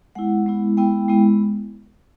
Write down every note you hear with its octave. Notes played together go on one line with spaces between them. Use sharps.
G#3 B3 E4 F#5
G#3 B3 E4
G#3 B3 E4 G5
G#3 B3 E4